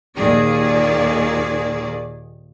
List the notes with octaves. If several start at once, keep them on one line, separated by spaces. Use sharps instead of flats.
D#2 A#2 D#3 G#4 D5